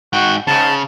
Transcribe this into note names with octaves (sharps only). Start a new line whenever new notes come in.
G#2 F#4 G5
G#2 C#3 A5